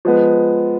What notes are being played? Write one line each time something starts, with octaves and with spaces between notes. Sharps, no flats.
F3 G#3 B3